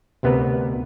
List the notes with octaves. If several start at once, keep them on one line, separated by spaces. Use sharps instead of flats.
D2 C3 B3 A#4 B4